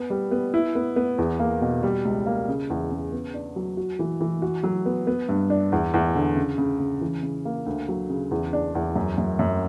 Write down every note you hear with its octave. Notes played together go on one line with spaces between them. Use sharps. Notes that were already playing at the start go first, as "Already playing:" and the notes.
Already playing: B3
G3
B3
E4
B3
B3
E2
A#3
B2
G3
C#2
A#3
C#3
E2
C#3
B3
D4
F#3
F#4
E3
E3
F#4
F#3
B3
B3
G2
D4
E2
E2
D3
C#3
C#3
C#3
E3
C#3
A#3
D2
F#3
C#3
E2
D4
E2
F#2
F#2
F#2